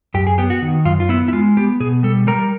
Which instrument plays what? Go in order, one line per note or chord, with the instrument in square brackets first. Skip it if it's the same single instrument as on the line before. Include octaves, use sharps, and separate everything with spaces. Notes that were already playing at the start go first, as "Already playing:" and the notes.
[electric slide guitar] F#2 G4
G#4
B3 G4
F#4
D#3
F#2 F4
F4
B3 E4
E4
G#3 F4
B3 G4
B2 G#4
G3 A4
G3 A#4